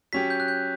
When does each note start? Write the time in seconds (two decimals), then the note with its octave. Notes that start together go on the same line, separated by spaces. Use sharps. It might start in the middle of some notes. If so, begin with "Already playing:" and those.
0.13 F#3 C#4 G4 B6
0.30 G6
0.40 F#6
0.48 G6